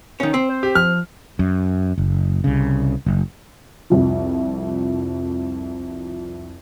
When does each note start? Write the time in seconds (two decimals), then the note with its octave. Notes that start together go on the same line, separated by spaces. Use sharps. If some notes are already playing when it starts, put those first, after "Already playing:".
0.20 D#3 C#4
0.34 C4
0.49 C5
0.63 G4
0.75 F3 F6
1.39 F#2
1.98 F#1
2.44 C2 C#3
3.06 F#1
3.90 C2 F2 F3